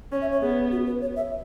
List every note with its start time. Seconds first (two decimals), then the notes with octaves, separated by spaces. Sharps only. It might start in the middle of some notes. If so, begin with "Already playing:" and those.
0.12 C#4 C#5
0.21 E5
0.32 C#5
0.42 B3 G#4
0.72 F#4
0.86 B4
1.01 C#5
1.16 E5